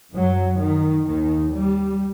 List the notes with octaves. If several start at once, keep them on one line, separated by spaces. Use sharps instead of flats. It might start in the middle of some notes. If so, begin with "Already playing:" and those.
F#2 F#3
D#3
D#2 D#3
G3